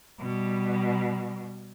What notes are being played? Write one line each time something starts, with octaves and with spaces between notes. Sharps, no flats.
B2 G3